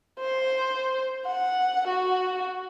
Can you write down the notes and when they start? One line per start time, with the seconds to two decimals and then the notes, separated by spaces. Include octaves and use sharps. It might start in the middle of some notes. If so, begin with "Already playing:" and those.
0.19 C5
1.26 F#5
1.87 F#4